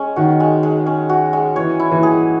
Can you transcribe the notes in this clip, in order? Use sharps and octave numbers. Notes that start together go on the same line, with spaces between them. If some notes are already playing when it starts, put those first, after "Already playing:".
Already playing: G#3 C#4
D#3 F#4
G#3
G#3
C#4
F#4
G#3
E3 C#5
E4
E3
G#4